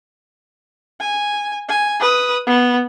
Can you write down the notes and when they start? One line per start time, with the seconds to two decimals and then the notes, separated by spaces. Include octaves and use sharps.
1.01 G#5
1.69 G#5
2.00 B4 D#6
2.47 B3